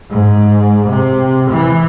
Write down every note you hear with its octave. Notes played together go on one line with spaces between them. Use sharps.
G#2
C3
E3